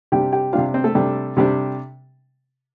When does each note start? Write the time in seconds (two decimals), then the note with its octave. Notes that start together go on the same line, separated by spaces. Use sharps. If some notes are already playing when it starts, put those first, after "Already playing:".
0.12 C3 G3 D4 G4 G5
0.32 G4 G5
0.53 C3 G3 D4 F4 F5
0.74 C4 C5
0.84 A3 A4
0.95 C3 G3 D4
1.37 C3 G3 D4